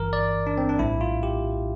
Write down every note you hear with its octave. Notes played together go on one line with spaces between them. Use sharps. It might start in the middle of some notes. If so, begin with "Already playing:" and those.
Already playing: G1 G2 E3 A#4
D5
D4
C4
D4
A#1 A2 G3 E4
F4
G4